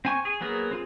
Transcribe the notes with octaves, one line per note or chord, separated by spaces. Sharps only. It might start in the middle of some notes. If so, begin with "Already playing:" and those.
C4 G#5 C#6
G#4
F#3 A#3 B3 G#4 A#4
C4 F4 G#4